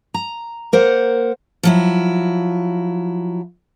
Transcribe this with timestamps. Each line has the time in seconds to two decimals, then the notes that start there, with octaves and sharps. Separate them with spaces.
0.14 A#5
0.73 A#3 A#4 C5 F#5
1.63 F3 F#3 E4